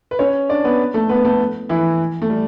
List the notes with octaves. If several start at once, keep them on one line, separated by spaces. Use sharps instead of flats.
B4
C#4 C#5
D4 D5
B3 B4
A3 A4
B3 B4
A3 A4
E3 E4
A3
G3